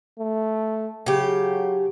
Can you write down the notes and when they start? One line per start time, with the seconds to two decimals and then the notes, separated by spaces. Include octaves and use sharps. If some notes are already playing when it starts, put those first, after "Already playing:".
0.20 A3
1.06 C#3 F#3 G4